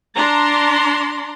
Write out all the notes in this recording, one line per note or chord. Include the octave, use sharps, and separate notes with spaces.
D4 A#5 C6